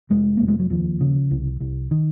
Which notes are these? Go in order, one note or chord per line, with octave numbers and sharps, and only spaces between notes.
F1 G#3
F1 A#3
G#3
F#3
D#2 F3
C#3
C2
C2
D#3